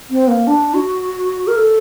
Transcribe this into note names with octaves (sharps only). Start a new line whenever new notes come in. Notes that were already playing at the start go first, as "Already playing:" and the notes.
C4
A#3
D4
F#4
A#4
A4